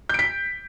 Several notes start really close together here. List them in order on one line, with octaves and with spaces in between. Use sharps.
G6 D7 B6